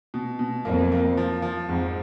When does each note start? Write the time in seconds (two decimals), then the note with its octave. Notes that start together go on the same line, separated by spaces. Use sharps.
0.14 B2
0.39 B2
0.65 F2 A#3
0.92 A#3
1.17 F3
1.42 F3
1.69 F2 G#2